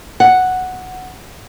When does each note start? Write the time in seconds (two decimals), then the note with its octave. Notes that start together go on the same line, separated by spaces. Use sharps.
0.20 F#5